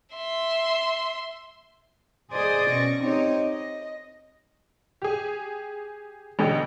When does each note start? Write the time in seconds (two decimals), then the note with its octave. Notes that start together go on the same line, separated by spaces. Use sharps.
0.15 E5 C6
2.32 G#4 C5 D5 D#5 C6 D#6
2.71 B2 C#4 C#6 A#6
3.03 C4 D#4 G4 C#5 D#5
3.48 D#5
5.02 G4 G#4
6.39 A1 B2 D3 G4 D#5 G5